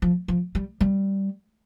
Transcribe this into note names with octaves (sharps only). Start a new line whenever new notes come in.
F3
F3
G3
G3